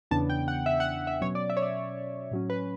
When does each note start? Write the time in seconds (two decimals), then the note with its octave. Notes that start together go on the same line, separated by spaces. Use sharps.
0.11 E2 C#3 E3 B3 D4 A5
0.30 G5
0.48 F#5
0.66 E5
0.80 F#5
0.94 F#5
1.07 E5
1.21 B2 F#3 C#4 C#5
1.35 D5
1.50 E5
1.57 C#5
1.62 D5
2.31 A2 F#3 C#4
2.50 B4